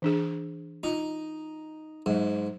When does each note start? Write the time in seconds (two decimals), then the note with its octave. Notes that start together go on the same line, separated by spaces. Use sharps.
0.02 E3 D4 G#4
0.83 D#4 F4
2.06 G#2 F#3